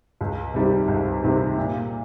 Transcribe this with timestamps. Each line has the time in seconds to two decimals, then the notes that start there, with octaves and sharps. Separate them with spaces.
0.21 C#2
0.54 C3 D#3 G3
0.88 C#2
1.22 C3 D#3 G3
1.57 A#2